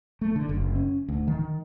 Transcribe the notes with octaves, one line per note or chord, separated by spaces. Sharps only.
A3
D3
F#1
C#4
D2
D#3